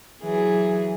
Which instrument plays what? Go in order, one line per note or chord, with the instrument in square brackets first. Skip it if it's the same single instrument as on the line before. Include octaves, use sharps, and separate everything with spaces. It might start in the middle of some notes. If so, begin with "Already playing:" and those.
[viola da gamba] E3 F#3 G#4